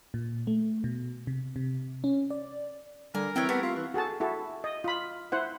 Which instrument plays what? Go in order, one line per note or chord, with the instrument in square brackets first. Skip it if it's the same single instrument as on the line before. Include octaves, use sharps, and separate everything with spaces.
[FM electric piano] A#2
A3
B2
C3
C3
C#4
D5
[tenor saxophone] D3 [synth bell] G3 [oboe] A#4 [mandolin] G#5
[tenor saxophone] E3 [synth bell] C4 [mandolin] C#5 E5 G5
[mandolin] A3 [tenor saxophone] B3 [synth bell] G4
[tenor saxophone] F4 [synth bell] B6 C7
[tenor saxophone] E3 [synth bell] C#6
[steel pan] F#4 G#4 A4 A5
E4 F#4 A4
D#5
F4 B5
E4 C5 F#5